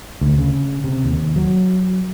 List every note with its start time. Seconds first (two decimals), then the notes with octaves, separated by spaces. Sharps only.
0.21 D2
0.38 C#3
0.84 C3
1.04 D#2
1.36 F#3